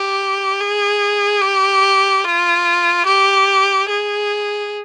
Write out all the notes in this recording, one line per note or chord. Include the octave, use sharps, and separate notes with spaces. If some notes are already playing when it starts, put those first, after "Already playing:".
Already playing: G4
G#4
G4
F4
G4
G#4